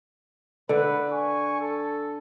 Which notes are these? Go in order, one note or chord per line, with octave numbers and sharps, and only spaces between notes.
D3 B4
G#5 C#6
A4